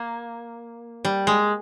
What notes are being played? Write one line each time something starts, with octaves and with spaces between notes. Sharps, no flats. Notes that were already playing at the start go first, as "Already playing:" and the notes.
Already playing: A#3
G3
G#3